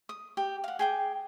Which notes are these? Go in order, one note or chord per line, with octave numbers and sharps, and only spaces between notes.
D#6
G4
F5 F#5
G#4 G5 D6